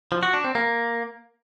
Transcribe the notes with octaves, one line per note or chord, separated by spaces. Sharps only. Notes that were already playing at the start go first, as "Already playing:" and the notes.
F3
F#4
D4
C4
A#3